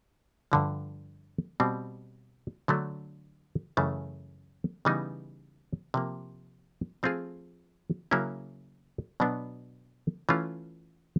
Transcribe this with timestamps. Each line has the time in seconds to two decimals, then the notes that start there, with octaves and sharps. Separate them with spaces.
0.52 G2 D3 F3
1.60 B2 G3 C4
2.68 D3 F#3 A3 D4
3.77 F#2 C#3 E3 A3
4.85 C#3 E3 G3 B3 D#4
5.94 C3 F3 A#3
7.03 F3 A3 C4 F4 G#4
8.11 C#3 F#3 A#3 C#4 E4
9.20 B2 F#3 B3 D4
10.29 E3 A3 C#4 F4